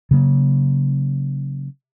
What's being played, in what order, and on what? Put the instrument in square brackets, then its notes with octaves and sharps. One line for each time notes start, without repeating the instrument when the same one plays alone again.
[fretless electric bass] C#3 F#3 A#3